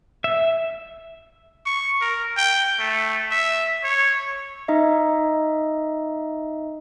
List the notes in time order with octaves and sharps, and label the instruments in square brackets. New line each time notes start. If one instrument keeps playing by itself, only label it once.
[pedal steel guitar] E5
[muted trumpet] C#6
A#4
G5
A3
E5
C#5
[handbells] D#4 D#5 E5